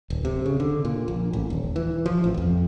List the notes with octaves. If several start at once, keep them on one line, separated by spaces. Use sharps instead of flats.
D1
C3
C#3
D3
A#2
A#1
A1
D#1
E3
F3
A1
F2